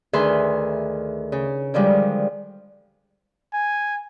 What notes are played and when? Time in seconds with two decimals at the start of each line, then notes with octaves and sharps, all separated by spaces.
0.13 D2 D#3 G#4 B4 E5 C6
1.32 C#3
1.74 D3 D#3 F3 G3 G#3
3.54 G#5